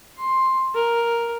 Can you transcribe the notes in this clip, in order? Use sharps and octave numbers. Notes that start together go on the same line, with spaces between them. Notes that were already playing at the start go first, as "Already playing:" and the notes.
C6
A#4